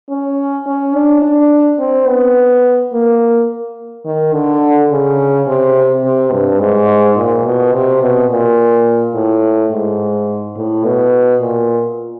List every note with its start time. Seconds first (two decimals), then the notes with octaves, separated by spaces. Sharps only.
0.10 C#4
0.66 C#4
0.94 D4
1.22 D4
1.79 C4
2.07 B3
2.93 A#3
4.05 D#3
4.33 D3
4.91 C#3
5.47 C3
6.04 C3
6.32 G2
6.60 G#2
7.17 A#2
7.45 B2
7.73 C3
8.02 B2
8.30 A#2
9.14 A2
9.71 G#2
10.56 A2
10.85 B2
11.41 A#2